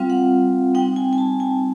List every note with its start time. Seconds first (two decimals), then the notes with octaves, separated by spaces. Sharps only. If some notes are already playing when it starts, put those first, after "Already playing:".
Already playing: G3 C4 F4 F5
0.10 F#5
0.74 G3 C4 D#4 G5
0.96 G#5
1.13 G#5
1.18 A5
1.40 G#5